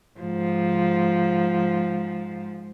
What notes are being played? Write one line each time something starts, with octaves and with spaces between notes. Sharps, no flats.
G#2 F3